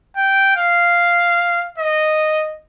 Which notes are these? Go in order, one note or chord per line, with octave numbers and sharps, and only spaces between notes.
G5
F5
D#5